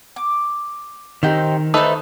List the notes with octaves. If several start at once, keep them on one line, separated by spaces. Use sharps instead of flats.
D6
D#3 C4 D#4 G4
A3 D#4 A4 B4 C5